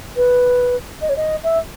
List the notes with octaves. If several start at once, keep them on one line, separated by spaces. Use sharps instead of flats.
B4
D#5
C#5
D#5
E5